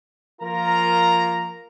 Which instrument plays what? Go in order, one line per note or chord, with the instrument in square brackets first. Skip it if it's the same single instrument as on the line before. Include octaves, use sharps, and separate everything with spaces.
[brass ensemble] F3 A#3 F4 A#4 A#5